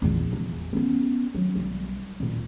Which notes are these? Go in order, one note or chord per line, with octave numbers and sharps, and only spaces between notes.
A#1 E2
E1 E2
B3 C#4
F#3
B1 G3
D1 A#2